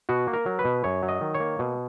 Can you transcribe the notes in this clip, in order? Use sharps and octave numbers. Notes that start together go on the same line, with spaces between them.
B2 F#4
A#3
A#4
F#3
B4
B2
F#2 C#5
F#3
D#5
D#3
C#5
A#3
B2